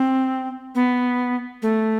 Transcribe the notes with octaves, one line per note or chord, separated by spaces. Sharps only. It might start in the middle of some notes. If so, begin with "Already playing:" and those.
Already playing: C4
B3
A3